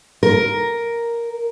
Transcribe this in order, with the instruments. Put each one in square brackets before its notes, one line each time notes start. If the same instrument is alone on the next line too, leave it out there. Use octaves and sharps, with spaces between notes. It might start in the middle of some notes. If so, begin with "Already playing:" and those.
[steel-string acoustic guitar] A#4